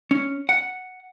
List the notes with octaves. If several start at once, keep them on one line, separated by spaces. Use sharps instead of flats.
C#4
F#5